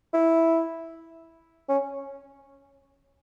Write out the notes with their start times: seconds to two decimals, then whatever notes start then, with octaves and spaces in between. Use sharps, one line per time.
0.13 E4
1.69 C#4